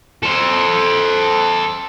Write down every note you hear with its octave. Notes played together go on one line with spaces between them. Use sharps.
A4 C5